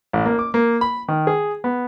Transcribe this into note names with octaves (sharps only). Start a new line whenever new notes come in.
A1
A#3
D6
A#3
B5
D#3
G#4
B3